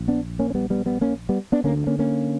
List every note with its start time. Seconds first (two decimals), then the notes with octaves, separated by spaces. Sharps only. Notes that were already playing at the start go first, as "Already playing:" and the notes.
Already playing: A#1
0.08 B3 D4
0.39 A#3 C#4
0.50 C#4
0.55 G3 B3
0.70 G3 B3
0.86 G3 B3
1.01 A#3 C#4
1.29 G3 B3
1.52 B3 D4
1.64 D2 D3 A#3 C#4
1.87 A#3 C#4
1.99 A#3 C#4